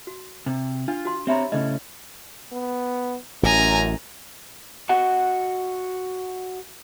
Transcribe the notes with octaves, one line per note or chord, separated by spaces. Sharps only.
F#4
C3
D4 F4
F#4 C6
C4 G4 C#5 E5 A#5 B5
A2 C#3 C#4 D#5
B3
A1 F#2 G#5 A#5
F#4 D#5 F#5